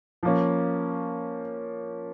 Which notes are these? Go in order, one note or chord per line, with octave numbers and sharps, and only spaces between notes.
F3 A#3 C#4